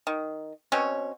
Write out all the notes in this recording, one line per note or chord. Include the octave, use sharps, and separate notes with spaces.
D#3
B2 C4 C#4 C#5